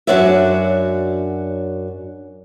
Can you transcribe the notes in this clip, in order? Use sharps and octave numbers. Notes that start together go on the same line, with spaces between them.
F#2 D4 F#4 C#5 D5 E5